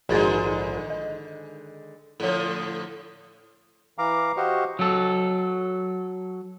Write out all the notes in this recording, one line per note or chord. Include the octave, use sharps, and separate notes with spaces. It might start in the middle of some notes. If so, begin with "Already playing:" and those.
A#1 G#2 D3 D#3 G#3 F#4 G#4 A6
D#5
A2 D3 F3 A4 C#5
E3 F5 A#5 D6
F#4 G4 C5 D#5 F5 C#6
F#3 A4